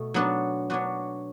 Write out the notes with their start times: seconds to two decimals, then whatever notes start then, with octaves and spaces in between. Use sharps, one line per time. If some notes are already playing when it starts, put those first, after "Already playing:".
Already playing: B2 A3
0.14 F#3 B3 D4 F#4
0.70 F#3 B3 D4 F#4